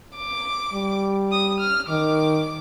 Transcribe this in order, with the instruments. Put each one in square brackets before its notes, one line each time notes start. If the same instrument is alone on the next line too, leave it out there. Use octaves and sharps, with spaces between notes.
[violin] D6
[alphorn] G3
[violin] D#6
F6
[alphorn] D#3 [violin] D6